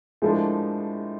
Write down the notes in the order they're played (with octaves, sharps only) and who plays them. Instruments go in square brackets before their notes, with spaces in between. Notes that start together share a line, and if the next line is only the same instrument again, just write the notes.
[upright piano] A2 F3 A#3 D4 [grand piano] G#3